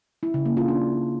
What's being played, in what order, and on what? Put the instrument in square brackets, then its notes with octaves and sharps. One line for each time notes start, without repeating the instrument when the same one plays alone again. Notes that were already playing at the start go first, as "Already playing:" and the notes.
[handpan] E4
C#3
A#3
F4
D4